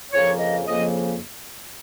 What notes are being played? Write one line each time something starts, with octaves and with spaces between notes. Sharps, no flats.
F2 C#3 F3 A#3 C#5
D#5
F2 C#3 F3 A#3 D#5